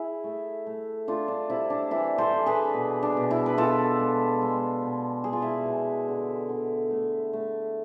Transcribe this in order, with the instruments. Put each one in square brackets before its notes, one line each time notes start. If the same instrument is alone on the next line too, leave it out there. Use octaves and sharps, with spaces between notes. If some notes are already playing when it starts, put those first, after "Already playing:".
Already playing: [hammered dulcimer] E4 G#4
A3
A3
A3 D4 F4
D4
C3 E4
D4
E3 E4
A4 C5
E3
G#4 B4
B2
D4
B2
E4
B4
B2 F4 A4
G#3
G#3
B2
G#3 G#4
F4
E4 G#4
B2
D3
D3
A3
A3